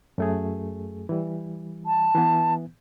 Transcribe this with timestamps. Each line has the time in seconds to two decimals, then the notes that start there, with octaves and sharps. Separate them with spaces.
0.18 F#2 A3 G#4
1.09 E3 G3
1.86 A5
2.15 E3 B3